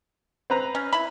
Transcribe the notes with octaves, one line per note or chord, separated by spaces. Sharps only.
C4 B4 A#5
C#4
E4 B5